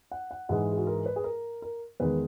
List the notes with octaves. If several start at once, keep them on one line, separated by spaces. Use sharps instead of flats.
F#5
F#5
G#2 E3 G#3 F#5
G#4
F#4
A#4
B4
G#4
A#4
A#4
E2 D#3 G#3 B4